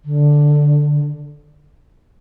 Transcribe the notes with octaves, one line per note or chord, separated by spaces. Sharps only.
D3